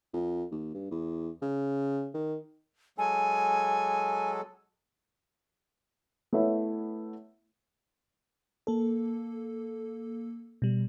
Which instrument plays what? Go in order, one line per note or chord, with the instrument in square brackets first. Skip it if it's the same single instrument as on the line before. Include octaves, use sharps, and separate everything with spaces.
[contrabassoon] F2
D#2
G2
E2
C#3
D#3
[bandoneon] F#3 G#3 A4 [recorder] G#5
[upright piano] A3 B3 E4 C#5 E5
[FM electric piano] A#3 A4
B2 G3